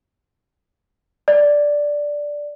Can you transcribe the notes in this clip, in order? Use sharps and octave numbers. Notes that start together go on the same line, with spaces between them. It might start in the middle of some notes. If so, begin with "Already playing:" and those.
D5